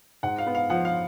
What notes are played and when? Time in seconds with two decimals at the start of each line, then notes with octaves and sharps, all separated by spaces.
0.23 G#2 F#5
0.38 F5
0.47 B3
0.55 F5
0.70 F3 F#5
0.85 F5